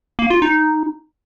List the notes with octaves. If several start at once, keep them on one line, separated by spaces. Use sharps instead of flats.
A#3
F4
D#4